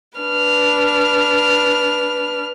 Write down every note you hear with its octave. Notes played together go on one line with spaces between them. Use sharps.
D4 B4 F6